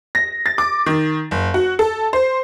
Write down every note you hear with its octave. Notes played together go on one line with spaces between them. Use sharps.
A#6
A6
D6
D#3
F#1
F#4
A4
C5